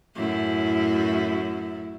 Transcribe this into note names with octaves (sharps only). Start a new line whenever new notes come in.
F#2 A2 E4